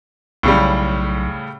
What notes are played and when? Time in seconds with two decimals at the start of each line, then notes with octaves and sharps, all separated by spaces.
0.43 B1 A2 C#3 G3